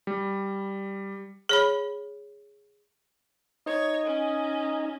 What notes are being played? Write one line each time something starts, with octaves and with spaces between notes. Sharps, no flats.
G3
G#4 C#5 B5
D#4 C#5 D#5
C#4